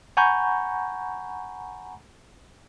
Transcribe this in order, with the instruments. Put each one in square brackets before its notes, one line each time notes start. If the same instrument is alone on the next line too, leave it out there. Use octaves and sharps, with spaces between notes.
[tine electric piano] F#5 G#5 A#5 B5 C#6 G6